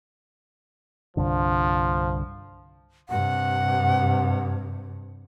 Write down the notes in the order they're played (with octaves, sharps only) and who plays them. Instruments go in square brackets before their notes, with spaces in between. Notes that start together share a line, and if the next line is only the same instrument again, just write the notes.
[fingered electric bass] C2 G2 D3 [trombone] F3
[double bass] G2 C3 [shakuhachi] F#5